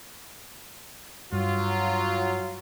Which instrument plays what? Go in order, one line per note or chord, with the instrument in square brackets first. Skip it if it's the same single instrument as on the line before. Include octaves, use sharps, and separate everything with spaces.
[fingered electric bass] G2 [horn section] F#3 F4